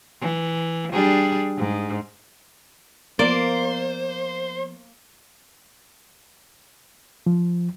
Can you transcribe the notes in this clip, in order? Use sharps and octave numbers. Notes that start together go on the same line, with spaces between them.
E3
G3 D4 G#4
G#2
F3 A#3 B3 C5 D5
F3